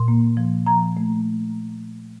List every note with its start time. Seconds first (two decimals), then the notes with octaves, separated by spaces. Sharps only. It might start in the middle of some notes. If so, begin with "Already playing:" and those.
Already playing: A#2 C6
0.08 A#3
0.37 F3
0.66 F3 A#5
0.97 A3